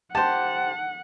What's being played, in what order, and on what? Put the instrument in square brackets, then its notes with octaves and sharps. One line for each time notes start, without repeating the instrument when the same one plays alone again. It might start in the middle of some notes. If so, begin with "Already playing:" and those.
[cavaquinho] G4 C5 [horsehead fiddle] F#5 [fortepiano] A5